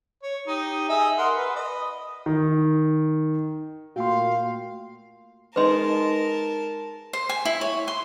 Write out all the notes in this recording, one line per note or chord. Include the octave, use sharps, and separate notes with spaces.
C#5
D#4 G4
G#4 D#5 E5
A#4 F#5 C6
B4
D#5
D#3
A#2 A3 F#4 F5 G5 C6
G#3 D#4 A#4 B4 A5 C6
C5
G#5
E4
C#5
C6